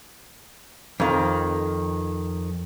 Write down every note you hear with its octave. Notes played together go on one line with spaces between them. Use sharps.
F2 D#3